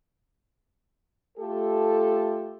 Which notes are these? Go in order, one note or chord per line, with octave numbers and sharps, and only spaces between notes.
A3 F4 G4 A4